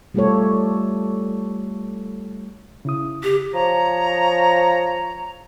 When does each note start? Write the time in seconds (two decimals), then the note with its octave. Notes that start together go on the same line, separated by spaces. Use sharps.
0.14 G3 A3 F4 G4 A4 C#5
2.85 C#3 E4 D#6
3.23 G4
3.53 F3 C#5 A#5